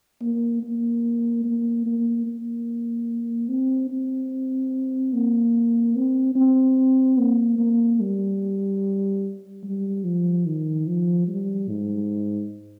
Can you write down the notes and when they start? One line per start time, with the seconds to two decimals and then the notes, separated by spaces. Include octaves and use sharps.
0.21 A#3
0.63 A#3
1.45 A#3
1.86 A#3
2.26 A#3
3.49 C4
3.90 C4
5.13 A#3
5.96 C4
6.35 C4
7.18 A#3
7.59 A#3
8.00 G3
9.63 G3
10.04 F3
10.46 D#3
10.87 F3
11.28 G3
11.69 G#2